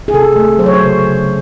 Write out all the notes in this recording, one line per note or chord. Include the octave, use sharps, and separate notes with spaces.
G#4
C3 A4
A3
F#3 C5
C#5
C5
C#3
C#3